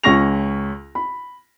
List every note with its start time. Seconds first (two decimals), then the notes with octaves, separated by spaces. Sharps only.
0.03 C#2 C#4 C#6 A#6 F7
0.95 B5